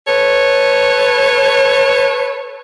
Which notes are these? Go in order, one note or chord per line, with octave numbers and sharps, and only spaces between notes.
A4 B4 C#5